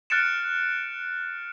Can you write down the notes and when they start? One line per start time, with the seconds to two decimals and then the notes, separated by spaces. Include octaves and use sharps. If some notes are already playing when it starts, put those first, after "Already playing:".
0.10 F6 F#6 A6 C#7 D7 E7